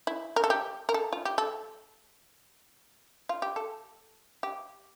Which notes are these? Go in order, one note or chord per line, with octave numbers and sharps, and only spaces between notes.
E4
A#4
A4
G4
A#4
A4
F4
G4
A4
F4
G4
A4
G4